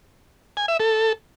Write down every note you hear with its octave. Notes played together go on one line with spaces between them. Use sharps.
G#5
E5
A4